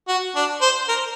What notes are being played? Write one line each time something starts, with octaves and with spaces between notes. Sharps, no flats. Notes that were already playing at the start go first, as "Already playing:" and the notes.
F#4
D4
C5
A#4